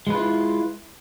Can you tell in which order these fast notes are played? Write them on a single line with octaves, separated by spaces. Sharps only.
G#3 B4 F4 E4